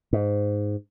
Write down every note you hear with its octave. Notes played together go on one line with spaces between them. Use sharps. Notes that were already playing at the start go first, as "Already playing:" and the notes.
G#2